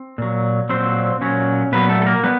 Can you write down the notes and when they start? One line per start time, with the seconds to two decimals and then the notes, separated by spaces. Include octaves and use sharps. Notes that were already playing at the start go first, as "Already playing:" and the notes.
Already playing: C4
0.18 A#2 F#3
0.69 A#2 F#3 C4 C5
1.21 A#2 F#3 C#4 C#5
1.72 A#2 F#3 B3 B4
1.89 A3 A4
2.02 A4
2.06 A#3 A#4
2.24 G3 B3 B4